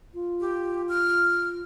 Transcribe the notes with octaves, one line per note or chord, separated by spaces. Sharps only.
F4
G4
F6